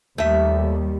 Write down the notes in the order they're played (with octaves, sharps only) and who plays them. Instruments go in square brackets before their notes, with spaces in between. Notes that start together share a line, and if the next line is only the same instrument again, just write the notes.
[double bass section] D#2 G3 [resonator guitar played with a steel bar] A3 E5